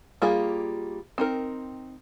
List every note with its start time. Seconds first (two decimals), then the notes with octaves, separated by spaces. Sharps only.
0.22 G3 A#3 F4 G#4
1.18 C4 D#4 A#4